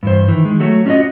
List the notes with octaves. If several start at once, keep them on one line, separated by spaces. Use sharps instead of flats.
G2 E3 C5
D#3 E3
D#3 G#3
F#3 A3 F#4
C#4 D4 F4 F#4 D#5